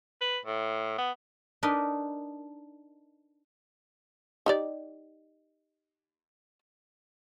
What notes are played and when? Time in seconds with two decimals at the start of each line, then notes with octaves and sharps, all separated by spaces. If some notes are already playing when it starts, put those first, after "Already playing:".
0.21 B4
0.45 A2
0.98 B3
1.63 D4 D#4 A#4 B4
4.46 D#4 G4 D5